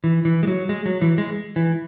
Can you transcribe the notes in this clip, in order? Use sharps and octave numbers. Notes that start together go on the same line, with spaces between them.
E3
E3
G#3
F#3
G#3
F#3
E3
G#3
E3